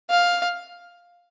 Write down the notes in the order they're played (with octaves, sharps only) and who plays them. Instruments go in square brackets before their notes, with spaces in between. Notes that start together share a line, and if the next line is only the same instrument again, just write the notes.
[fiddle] F5